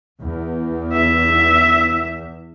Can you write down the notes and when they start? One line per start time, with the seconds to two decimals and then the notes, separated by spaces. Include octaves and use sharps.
0.20 E2
0.93 E5